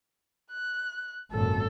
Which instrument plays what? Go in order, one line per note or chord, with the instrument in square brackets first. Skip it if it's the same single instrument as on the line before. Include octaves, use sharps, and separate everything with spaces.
[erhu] F#6
[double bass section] G#1 F#2 A#2 [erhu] A4